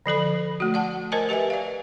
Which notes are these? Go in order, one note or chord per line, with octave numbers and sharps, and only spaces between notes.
D3 F3 A4 B5
A3 F#4
D5 F#5 A5
A#4 C5 D#5 G#5 A5
G4 B4 D#5 E5 G#5
D5 F5